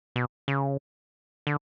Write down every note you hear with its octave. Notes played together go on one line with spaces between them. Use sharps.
B2
C#3
D3